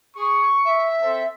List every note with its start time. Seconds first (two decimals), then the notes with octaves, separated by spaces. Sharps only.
0.15 G#4 C#6
0.64 E5
1.01 C4 A4